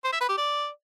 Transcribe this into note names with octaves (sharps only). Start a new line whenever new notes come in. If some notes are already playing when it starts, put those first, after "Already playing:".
C5
E5
B4
G4
D5